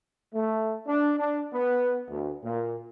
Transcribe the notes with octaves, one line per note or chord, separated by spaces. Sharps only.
A3
D4
D4
B3
D2
A#2